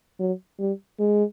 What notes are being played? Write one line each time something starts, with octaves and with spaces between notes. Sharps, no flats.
F#3
G3
G#3